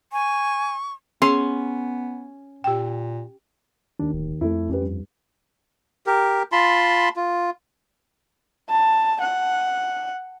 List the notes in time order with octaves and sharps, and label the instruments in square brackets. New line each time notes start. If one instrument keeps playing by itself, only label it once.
[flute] G#5 [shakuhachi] C#6
[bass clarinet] B3 [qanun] C#4 [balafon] G#4 [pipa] C6
[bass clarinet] A#2 [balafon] G4 G5
[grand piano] D#2 [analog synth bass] D4
[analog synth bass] D1
[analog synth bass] F2 [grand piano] A3 E4
[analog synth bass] F2 [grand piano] C#4 G4 B4
[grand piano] G2
[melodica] G4 A#4
F4 A5 B5 C6
F4
[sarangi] A5
F#5